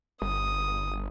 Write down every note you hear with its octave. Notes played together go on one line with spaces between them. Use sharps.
G1 D#6